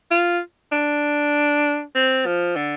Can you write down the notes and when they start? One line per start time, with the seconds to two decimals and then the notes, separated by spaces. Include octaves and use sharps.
0.11 F4
0.72 D4
1.95 C4
2.26 F3
2.56 D3